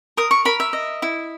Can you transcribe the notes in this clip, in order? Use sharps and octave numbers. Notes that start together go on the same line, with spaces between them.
A#4 D#6
C#6
A#4 B5
E5
D#5
E4